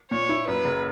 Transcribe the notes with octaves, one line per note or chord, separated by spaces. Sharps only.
A#2 C#5
E4
F#2 B4
F#1